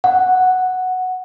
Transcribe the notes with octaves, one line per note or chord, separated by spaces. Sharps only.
F#5